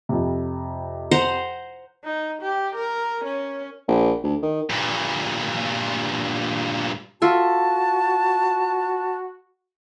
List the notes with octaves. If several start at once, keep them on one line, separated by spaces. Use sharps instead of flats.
F2 C3
C5 F#5 A#5
D#4
G4
A#4
C#4
A#1
D2
D#3
G2 A#2
F4 F#4 A4 E5 A5